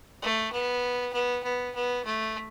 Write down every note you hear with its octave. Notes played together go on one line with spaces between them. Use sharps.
A3
B3
B3
B3
B3
A3